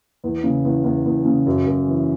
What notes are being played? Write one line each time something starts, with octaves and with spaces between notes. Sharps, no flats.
E2
C#3
E2
E2
E2
C#3
F#2
F#2
E3